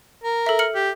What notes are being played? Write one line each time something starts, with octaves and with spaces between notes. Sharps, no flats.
A#4
A4 E5
F6 C#7 F#7
G4